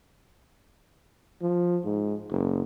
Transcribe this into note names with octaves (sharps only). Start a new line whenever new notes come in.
F3
G#2
F#1